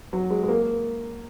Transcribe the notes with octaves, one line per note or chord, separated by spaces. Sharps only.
F#3
G#3
G#3
A#3